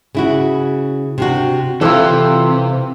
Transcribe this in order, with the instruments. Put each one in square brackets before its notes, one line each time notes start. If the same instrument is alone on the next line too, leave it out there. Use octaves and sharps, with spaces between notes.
[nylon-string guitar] C#3 E4 F#4
C3 D4 F#4
[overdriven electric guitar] C3 [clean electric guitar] E3 C4 F4 [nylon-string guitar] E4 A4